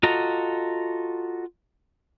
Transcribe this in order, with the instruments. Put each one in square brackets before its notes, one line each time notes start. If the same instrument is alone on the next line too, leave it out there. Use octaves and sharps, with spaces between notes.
[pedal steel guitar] F4 F#4 A4 D#5 A#5